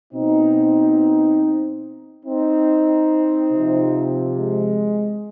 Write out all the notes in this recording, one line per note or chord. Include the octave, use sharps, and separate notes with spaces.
B2 C4 D#4
C4 D#4
C3
F3
G#3